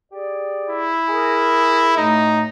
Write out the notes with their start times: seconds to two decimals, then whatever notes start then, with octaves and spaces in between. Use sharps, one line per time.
0.12 G4 G#4 D5
0.70 E4
1.09 G#4 A#4
1.97 F#2 A2 A3 D#4